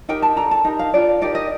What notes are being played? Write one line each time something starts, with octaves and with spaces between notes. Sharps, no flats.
D#4 G4 A#4 G5
A5
D4 A4 A#5
A5
D#4 G4 A#4
F5
D4 F4 A4 D5
D#4 G4 A#4 D5
D#5